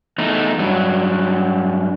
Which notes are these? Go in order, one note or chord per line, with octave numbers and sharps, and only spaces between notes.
E2 A3 D#4
G2 F#3